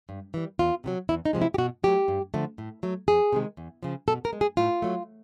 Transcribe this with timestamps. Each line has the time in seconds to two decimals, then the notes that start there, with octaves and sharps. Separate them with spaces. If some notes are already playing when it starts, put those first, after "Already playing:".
0.09 G2
0.34 E3 G3
0.59 E2 F4
0.84 C3 D#3 F#3
1.09 E2 E4
1.25 D#4
1.33 C3 F3 G#3
1.42 E4
1.54 G4
1.58 B2 F#4
1.83 F#3 A3 G4
2.08 G2
2.34 D3 F3 A3
2.58 A2
2.83 F#3 A3
3.08 F2 G#4
3.32 C3 D#3 G#3
3.57 E2
3.83 C#3 F3
4.08 B2 A4
4.25 A#4
4.33 G#3
4.41 G#4
4.57 A2 F4
4.82 F#3 A3